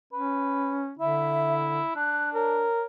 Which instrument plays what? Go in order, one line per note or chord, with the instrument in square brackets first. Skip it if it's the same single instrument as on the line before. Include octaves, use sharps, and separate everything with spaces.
[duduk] C#4 [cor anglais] B4
[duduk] D3 [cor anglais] E4 [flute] E5
[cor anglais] D4 [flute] F#6
[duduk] A#4 [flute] C#5